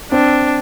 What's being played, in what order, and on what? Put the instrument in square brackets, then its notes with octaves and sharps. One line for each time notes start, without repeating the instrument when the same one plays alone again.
[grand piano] C4 [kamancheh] D4